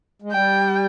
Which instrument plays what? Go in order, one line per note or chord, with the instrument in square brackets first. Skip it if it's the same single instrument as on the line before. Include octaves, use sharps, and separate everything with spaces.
[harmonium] G#3
[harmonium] G3 [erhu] G5